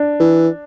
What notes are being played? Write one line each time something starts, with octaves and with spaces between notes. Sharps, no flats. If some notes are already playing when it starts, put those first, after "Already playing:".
Already playing: D4
E3